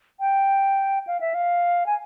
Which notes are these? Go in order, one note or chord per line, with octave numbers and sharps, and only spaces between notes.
G5
F5
E5
F5
G#5